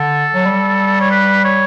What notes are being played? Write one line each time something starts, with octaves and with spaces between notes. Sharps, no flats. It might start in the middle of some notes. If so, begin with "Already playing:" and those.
Already playing: D3 A4
F#3
G3
C#5
B4
C#5